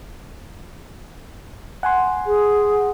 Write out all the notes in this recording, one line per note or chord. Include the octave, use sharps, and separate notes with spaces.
F#5 G#5 C6
G#4